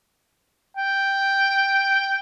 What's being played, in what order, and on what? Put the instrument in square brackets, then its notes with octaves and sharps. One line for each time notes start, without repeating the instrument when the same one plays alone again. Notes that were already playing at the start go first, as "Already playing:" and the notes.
[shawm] G5